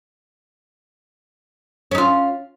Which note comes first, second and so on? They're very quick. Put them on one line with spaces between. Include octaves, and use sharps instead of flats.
C#4 D#4 F4